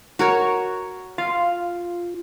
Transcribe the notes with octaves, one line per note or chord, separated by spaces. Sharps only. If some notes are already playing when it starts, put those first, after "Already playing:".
F#4 A#4 C#5
F4 F5